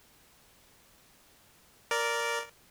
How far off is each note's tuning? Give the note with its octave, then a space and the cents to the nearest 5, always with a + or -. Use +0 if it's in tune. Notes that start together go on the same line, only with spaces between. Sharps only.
A#4 +0 D5 -10